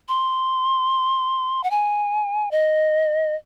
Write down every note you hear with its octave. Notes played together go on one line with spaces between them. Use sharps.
C6
F#5
G#5
D#5